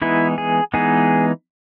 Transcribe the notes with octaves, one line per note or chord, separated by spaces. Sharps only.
E3 G#3 B3 D#4 E4
G#4
E3 G#3 B3 D#4 G#4